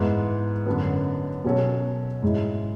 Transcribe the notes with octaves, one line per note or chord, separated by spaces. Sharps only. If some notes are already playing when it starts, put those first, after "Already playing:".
Already playing: G#2 E3 B3 E4
F#2 D3 F#3 B3
B2 F#3 C#4 F#4 A4
G#2 G#3 C#4 E4